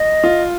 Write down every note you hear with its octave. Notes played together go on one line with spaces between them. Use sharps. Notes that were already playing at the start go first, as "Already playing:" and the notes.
Already playing: D#5
F4